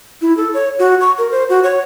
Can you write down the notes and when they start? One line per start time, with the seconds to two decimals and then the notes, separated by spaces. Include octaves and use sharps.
0.22 E4
0.37 A4
0.54 C#5
0.79 F#4
1.01 C#6
1.18 A#4
1.31 C5
1.49 F#4
1.63 C#5